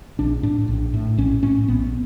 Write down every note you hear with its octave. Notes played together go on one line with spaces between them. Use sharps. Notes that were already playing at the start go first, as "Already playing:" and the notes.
A#1 D4
A2 D4
A#1
A2
A#1 C#4
A2 C#4
A#1 B3